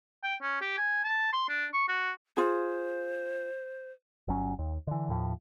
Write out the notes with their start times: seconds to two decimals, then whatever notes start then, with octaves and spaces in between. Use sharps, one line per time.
0.23 G5
0.42 C#4
0.61 G4
0.78 G#5
1.04 A5
1.33 C6
1.49 D4
1.73 C#6
1.89 F#4
2.37 F4 G#4 C5
4.28 G1 F#3 C#4
4.59 D#2
4.87 D3 E3
5.09 D#2 A2 F3